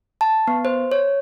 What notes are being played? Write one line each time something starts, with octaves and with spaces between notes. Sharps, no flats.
A5
B3
C5
C#5